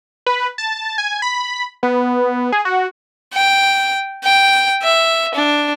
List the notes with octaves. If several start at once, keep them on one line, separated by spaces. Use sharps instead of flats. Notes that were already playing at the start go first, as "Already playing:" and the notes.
B4
A5
G#5
B5
B3
G#4
F#4
G5
G5
E5
D4